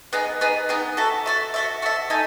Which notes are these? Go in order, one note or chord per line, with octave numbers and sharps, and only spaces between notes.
B3 D#4 G#4
B3 D#4 G#4
B3 D#4 G#4
F#4 A4 E5
F#4 A4 E5
F#4 A4 E5
F#4 A4 E5
D#4 A4 E5 G#5